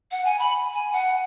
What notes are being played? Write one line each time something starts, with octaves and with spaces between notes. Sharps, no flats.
F#5
G#5
B5
G#5
F#5